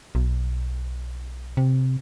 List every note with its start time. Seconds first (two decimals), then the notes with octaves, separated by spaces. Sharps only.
0.15 B1
1.57 C3